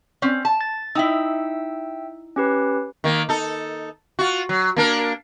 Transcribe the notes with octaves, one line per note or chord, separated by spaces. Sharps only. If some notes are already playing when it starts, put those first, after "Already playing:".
C4 C#4
A5
A6
D#4 E4 E5 G5 E6
C#4 G4 B4
D#3 A#3
D#4 A4
F4 F#4
F#3
A#3 D4 A#4